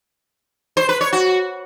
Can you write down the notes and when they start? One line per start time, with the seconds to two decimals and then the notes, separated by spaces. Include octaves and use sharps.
0.77 C5
0.89 B4
1.01 C#5
1.13 F#4